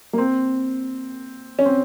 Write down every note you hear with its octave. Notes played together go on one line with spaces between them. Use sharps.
A#3
C4
C#4
C4